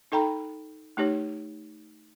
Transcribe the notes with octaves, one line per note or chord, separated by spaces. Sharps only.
D#4 A4 G5 A#5 B5
A3 D#4 G4 C#5